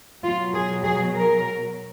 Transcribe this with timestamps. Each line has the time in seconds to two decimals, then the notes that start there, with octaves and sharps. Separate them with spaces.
0.23 B2 F#3 F4
0.53 G#4
0.84 G#4
1.15 A#4